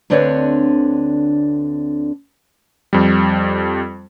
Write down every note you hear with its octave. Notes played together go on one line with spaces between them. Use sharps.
D2 D3 C4 D4 B4 C#5
F2 G3